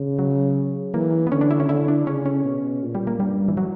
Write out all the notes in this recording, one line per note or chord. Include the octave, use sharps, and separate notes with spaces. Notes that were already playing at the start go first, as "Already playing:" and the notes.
Already playing: C#3
F#3
E3 A#3
B3
D3 C#4
D4
E4
C#4
D3 E4
D4
C#3 C#4
C#4
B2
A#2
G3
A#3
G2 G3
E3
F#3